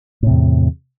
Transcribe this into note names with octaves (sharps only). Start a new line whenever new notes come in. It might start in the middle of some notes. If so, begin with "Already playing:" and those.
E2 A2 C3